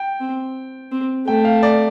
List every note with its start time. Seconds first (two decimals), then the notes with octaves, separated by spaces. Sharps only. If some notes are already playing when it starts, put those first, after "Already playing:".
Already playing: G5
0.20 C4
0.91 C4
1.27 A3 G5
1.45 F5
1.63 D5